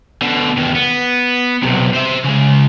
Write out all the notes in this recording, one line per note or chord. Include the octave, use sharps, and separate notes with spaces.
B2 D3
E2 D#3
B3
B1 C3
C5 E5
C#3 G#3